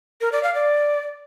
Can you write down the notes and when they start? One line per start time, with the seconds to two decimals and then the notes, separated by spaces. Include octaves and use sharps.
0.21 A#4
0.32 D5
0.43 F5
0.54 D5